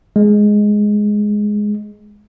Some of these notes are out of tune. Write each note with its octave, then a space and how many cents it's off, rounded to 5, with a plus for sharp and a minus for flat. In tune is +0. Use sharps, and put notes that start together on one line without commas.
G#3 +5